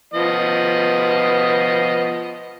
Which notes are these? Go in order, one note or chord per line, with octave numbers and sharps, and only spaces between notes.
F3 B3 D#5